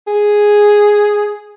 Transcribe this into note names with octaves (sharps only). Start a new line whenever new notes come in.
G#4